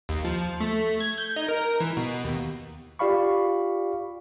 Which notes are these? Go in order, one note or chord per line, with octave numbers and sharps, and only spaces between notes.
D#2
F3
A3
G#6
G6
D#4
A#4
E3
B2
D#2
F4 G4 D5 F5 B5 C#6